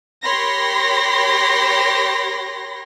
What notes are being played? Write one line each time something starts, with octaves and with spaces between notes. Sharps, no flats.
G4 A#4 C#5 B5 C6 A#6